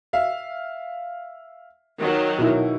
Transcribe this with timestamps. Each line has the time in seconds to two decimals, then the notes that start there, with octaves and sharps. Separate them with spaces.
0.13 E5 F5
1.99 D#3 F#3
2.38 B2 D#4 E4